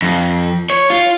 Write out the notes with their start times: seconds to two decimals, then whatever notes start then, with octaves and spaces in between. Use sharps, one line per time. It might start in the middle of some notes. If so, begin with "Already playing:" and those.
0.02 F2
0.70 C#5
0.90 F4